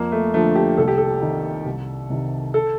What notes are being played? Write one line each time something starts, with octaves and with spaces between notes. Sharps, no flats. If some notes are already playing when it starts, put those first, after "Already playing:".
Already playing: F2 A#3
A3
D3 F3 A3
G4
C2 A4
G4
A4
C3 D#3
C2
C3 D#3
A4